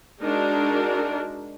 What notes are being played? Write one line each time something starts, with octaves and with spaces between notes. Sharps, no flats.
G#3 D4 D#4 F#4 A#4